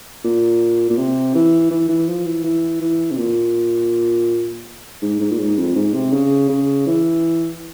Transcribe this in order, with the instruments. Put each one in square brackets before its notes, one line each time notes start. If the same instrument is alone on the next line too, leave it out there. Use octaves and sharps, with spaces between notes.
[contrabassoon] A#2
A#2
C3
E3
E3
E3
F3
E3
E3
E3
C3
A#2
G#2
G#2
A#2
G#2
F2
G#2
C3
C#3
C#3
E3